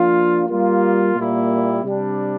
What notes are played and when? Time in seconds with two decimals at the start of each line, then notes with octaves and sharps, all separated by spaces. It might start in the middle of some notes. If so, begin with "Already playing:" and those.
Already playing: F3 A#3 D4 F4
0.47 G3 A#3 F4
1.14 A#2 G3 A#3 E4
1.82 C3 G3 D4